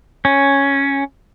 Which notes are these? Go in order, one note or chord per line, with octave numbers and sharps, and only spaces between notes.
C#4